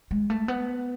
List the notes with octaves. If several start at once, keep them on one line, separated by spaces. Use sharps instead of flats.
G#3
A3
B3